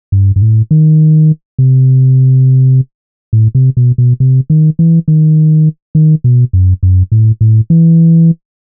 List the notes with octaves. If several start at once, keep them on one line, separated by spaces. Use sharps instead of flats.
G2
G2
A2
D#3
C3
A2
C3
B2
B2
C3
D#3
E3
D#3
D#3
B2
F#2
F#2
A2
A2
E3